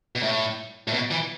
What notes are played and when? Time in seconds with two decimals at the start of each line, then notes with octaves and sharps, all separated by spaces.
0.16 B2
0.23 A2
0.88 A2
0.93 B2
1.11 E3